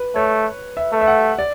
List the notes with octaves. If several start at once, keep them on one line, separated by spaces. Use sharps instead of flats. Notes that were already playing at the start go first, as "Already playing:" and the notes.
Already playing: B4
A3 C#5
E5
A3
E5
F#5
D5